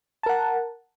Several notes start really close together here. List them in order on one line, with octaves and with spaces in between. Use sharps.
A5 A#4 F#5